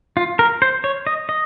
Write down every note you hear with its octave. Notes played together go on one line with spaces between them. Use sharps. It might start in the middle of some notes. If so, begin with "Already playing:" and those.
F4
A#4
C5
C#5
D#5
D#5